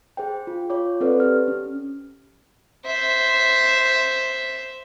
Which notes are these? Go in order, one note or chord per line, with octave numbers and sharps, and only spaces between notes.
G#4 C5 G5
F4
F4 C#5 D6
C4 A4 B4 C5 D5
G4 F6
C#4
C5 E5